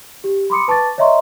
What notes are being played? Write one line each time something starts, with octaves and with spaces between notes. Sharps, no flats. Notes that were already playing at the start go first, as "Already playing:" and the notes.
G4
B5 C6 D6 D#6 C#7
B4 A5 C#6 D6 A6
C#5 D#5 E5 A#5 C6 C#6